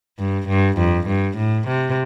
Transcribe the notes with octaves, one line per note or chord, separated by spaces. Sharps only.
G2
G2
F2
G2
A2
C3